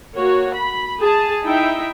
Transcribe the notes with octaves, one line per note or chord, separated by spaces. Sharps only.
A#3 F#4 C#5
B5
G#4 A5
D#4 E4 E5 G5